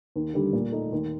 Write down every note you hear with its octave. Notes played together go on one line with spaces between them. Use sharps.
D#2
D3 G3
A#2
A3 D#4
D#2